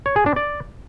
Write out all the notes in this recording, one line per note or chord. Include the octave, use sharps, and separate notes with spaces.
C#5
G#4
D4
D5